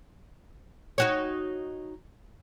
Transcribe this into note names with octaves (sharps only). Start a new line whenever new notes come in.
D#4 F#4 C#5